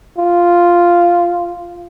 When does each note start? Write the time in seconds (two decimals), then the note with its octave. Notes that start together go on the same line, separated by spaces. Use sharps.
0.18 F4